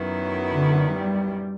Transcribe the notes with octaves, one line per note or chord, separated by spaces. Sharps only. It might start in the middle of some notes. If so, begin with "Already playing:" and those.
Already playing: F#2 D#3 F#3 B3 E4
D3
G3